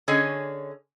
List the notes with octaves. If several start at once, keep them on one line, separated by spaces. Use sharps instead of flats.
D3 C#4 G#4 C#5 D#5 G#5